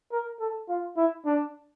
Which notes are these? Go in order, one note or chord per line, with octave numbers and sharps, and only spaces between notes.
A#4
A4
F4
E4
D4